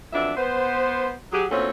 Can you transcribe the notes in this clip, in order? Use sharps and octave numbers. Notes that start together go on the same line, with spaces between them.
F2 F#3 B3 D4 E5
B3 C5
F#3 G4 G#4
D2 A#2 C4 C#4 A4 C#5